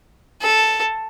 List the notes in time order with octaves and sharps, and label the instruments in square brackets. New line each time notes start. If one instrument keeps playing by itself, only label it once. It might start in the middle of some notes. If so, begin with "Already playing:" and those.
[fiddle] A4